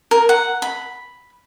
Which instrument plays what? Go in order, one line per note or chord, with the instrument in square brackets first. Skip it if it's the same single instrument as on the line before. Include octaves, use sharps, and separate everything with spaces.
[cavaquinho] A#4
F#5
B5